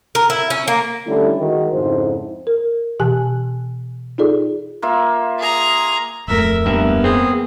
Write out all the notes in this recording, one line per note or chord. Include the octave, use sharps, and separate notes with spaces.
A#4
E4
C#4
A#3
D3 G3 A3 C#4 E4
D#3 G#3 F#4
F2 G#2 C#3 E4 C5
A#4
B2 E3 G4 G#5 A5 F#6
D#4 F4 G#4 A4 D5
A#3 F4 E5
G#4 A#5
D1 F2 A3 A#4 E5
G2 A#3 B3 A#4 E5
C4 G#4